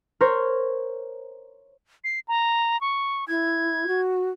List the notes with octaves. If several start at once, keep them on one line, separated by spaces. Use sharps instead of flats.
A#4 C5 C#5
C7
A#5
C#6
E4 G#6
F#4